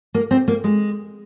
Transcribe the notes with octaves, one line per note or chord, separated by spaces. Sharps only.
A#3
C4
A#3
G#3